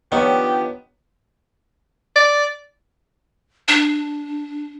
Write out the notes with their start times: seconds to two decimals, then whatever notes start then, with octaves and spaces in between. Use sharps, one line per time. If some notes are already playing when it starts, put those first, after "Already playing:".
0.12 D#3 F3 B3 D4 G4 C#5
2.16 D5
3.68 D4